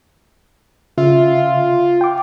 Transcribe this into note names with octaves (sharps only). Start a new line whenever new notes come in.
C#3 F4 E5
G5 D6